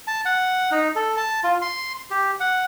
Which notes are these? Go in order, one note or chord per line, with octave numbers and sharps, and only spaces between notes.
A5
F#5
D#4
A4
A5
F4
C6
G4
F#5